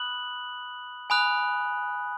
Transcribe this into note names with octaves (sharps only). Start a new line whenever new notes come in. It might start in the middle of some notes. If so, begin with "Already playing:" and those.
Already playing: B5 D#6 F#6 F#7
G#5 B5 D#6 F#6